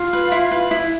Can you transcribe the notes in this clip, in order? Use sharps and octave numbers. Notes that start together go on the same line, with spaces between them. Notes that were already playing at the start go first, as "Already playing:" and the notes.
Already playing: F4 F5
B4
E4
B4
E4